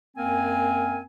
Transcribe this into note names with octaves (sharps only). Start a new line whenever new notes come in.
F#2 A#3 C4 A#4 G#5